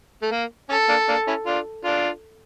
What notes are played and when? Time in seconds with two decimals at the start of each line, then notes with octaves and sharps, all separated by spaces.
0.22 A3
0.31 A#3
0.69 C#4 A4
0.89 A#3 D4
1.08 A#3 D4
1.27 C#4 E4
1.46 D4 F4
1.84 D4 F4